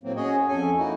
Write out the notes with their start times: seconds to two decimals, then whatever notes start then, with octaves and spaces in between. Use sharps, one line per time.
0.04 A2 F#3 A#3 C4
0.16 C#4 F#4 G#4 C#5 D#5
0.48 F2 C#4 A4 G#5
0.77 A#3 D#4 E4 F#4